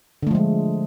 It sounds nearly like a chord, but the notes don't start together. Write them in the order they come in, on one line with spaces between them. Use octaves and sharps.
D3 A3 F3 G#3